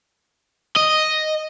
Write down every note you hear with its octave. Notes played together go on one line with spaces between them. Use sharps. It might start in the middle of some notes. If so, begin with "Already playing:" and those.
D#5